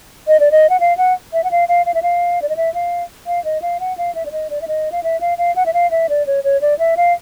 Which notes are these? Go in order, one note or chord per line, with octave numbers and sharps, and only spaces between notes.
D#5
D5
D#5
F#5
F5
F#5
E5
F#5
F5
F5
F5
E5
F5
D5
D#5
E5
F5
F5
D#5
F5
F#5
F5
E5
D5
D#5
D5
E5
D#5
F5
E5
F5
F5
F#5
E5
F5
E5
D5
C#5
C#5
D5
E5
F5